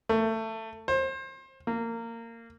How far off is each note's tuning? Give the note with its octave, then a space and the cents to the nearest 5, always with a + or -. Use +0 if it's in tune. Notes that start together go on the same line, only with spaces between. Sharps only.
A3 +20
C5 +30
A#3 -20